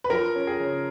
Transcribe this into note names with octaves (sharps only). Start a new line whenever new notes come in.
B4
F3 A#4
C#4
G#4
C#3